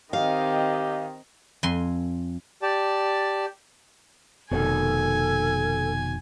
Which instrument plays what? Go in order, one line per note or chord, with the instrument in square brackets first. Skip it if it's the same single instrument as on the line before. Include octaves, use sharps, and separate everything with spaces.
[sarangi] D#3 [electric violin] C4 D#5 [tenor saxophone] G4 [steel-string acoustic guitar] F5
[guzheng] F2 G#5 C6
[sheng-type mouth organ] G4 D5 A5
[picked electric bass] F1 [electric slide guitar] B2 D#3 [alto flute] A4 [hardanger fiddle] G#5